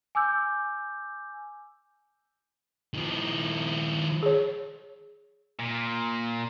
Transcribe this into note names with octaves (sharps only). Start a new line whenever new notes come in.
G#5 D6 E6 G6
D#3 F3
G#4 C#5
A#2